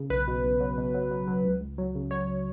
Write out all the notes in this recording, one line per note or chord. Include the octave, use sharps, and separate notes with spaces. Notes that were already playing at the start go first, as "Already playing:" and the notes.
Already playing: C#3
B1 B4
B2
B1
F#3
B2
F#3
F#3
F#3
C#2
C#2
F#3
C#3
F#3 C#5